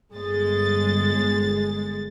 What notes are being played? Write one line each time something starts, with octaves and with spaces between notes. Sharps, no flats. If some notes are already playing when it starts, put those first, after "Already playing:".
G1 G#3 A6